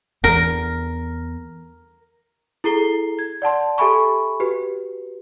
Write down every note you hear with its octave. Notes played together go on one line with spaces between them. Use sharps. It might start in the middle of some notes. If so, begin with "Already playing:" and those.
E2 A#4
E4 G#4 A4 A#5 C7 G7
G#6
D5 F#5 A5 C6
G4 A4 E5 G#5 B5 C#6
F#4 G4 B4